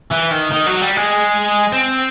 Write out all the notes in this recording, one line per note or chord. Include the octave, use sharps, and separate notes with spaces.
E3
D#3
D#3
F#3
G3
G#3
C4